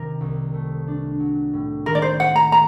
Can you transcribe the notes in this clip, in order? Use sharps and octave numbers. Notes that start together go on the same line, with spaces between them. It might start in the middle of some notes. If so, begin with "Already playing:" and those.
Already playing: C3 D#3 A#4
C2
A3
D4
F#3
A2
D#3 A#4
D5
C5
F#3 F#5
A#5
A#5